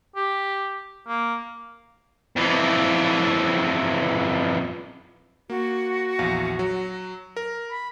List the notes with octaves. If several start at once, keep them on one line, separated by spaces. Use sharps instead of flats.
G4
A#3
F2 E3
A#3 F#4
A#1 E2 F5
F#3
A#4
B5